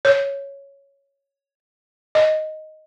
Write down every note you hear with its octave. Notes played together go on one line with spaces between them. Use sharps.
C#5
D#5